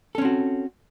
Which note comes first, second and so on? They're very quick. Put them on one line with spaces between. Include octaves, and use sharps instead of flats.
A4 C#4 C4 F#4